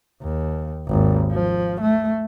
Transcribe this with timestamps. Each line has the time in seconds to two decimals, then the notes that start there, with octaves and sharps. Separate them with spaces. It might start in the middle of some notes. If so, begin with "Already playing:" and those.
0.22 D#2
0.88 G#1 D#2
1.32 F3
1.81 A3